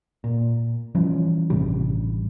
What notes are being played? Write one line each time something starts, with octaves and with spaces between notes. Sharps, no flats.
A#2
E3 F3 G3 C#4
A1 G2 C3 G3